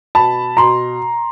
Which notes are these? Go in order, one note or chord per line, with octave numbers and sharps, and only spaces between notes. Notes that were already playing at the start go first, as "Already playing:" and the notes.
B2 A5 B5
B2 A#5 C6